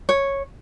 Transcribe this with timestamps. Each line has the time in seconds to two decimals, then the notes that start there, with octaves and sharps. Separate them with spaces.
0.09 C#5